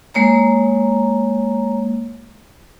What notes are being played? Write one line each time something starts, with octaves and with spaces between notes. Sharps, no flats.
G#3 A#3 C#5 A#5